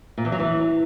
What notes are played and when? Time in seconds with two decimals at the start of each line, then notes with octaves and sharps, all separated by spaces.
0.18 A#2
0.25 E2
0.32 F#3
0.40 E3